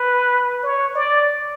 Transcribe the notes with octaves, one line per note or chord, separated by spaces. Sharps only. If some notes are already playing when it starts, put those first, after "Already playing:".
Already playing: B4
C#5
D5